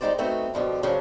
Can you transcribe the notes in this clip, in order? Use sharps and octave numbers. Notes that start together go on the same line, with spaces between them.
G3 G#3 D#4 F#4 C5 D5
A3 B3 C4 D#4 F#4 B4
B2 D3 F3 G3
F#2 C#3 F3 F#3 D4